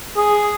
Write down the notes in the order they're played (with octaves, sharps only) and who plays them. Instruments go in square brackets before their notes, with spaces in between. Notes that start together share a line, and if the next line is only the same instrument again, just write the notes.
[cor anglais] G#4